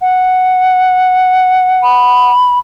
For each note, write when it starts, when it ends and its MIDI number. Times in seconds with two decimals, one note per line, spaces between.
0.01 2.31 78
1.83 2.59 83